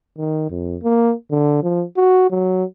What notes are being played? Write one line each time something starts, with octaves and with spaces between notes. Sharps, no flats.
D#3
F2
A#3
D3
F3
F#4
F#3